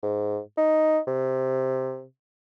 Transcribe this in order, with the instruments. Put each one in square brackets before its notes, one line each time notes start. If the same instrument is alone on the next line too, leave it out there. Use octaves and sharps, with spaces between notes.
[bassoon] G#2
D#4
C3